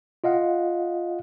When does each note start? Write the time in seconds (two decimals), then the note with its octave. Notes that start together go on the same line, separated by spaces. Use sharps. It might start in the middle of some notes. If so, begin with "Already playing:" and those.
0.24 F4 D#5 F5 F#5